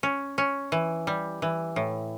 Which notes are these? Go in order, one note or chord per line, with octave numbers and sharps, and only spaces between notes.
C#4
C#4
E3
G3
E3
A2